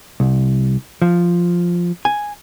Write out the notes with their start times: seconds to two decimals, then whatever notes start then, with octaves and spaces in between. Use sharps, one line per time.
0.20 C2
1.02 F3
2.05 G#5